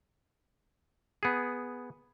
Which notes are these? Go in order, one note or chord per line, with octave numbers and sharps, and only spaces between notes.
B3 G#4